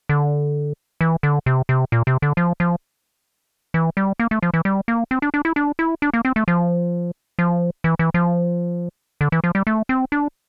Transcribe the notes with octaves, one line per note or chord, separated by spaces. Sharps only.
D3
E3
D3
C3
C3
A#2
C3
D3
F3
F3
E3
G3
A#3
A3
F3
E3
G3
A#3
C4
D4
D4
E4
D4
E4
D4
A#3
C4
A3
F3
F3
E3
E3
F3
D3
E3
F3
G3
A3
C4
D4